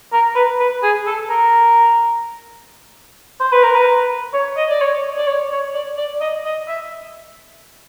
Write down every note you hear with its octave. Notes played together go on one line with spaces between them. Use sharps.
A#4
B4
B4
G#4
A4
A#4
C5
B4
A#4
B4
C#5
D#5
D5
C#5
D5
C#5
C#5
D5
D5
D#5
D#5
E5